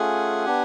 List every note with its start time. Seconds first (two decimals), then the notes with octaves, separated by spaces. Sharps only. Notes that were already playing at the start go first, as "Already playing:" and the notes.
Already playing: A3 C#4 F4 G#4 F#5 G#5
0.46 B3 D4 G4